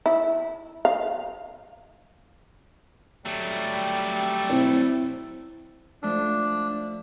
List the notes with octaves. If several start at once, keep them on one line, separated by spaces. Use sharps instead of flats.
E4
F5
F#3 G3 A3
C4 E4
F3 A3 D4